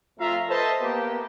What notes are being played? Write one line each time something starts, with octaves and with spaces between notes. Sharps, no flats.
F2 A3 F4 E5 F5 A#5
A4 B4 C5 D#5 E5 A5
A#3 B3 G4